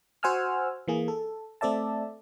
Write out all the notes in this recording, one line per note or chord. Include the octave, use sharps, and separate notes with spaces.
F#4 C5 F#5 G#5 E6 F6
E3 A#3 G#4
A4
A3 C4 A4 D5 E5 A5